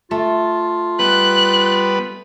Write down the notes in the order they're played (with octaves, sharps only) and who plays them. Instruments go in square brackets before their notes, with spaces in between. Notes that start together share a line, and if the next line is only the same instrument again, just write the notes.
[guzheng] A3 [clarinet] F4
[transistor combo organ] G3 B3 B4 [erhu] F#6